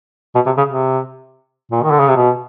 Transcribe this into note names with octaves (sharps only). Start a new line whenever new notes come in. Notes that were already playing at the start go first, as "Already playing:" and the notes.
B2
C3
C#3
C3
A#2
D#3
D3
C#3
C3
B2